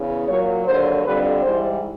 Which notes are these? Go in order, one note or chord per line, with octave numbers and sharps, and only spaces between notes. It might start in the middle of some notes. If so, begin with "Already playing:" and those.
Already playing: E2 C#3
A#2 F#3 C#5
D#2 D3 F#3 C5
F2 D3 G3 B4
G#2 E3 G3 C5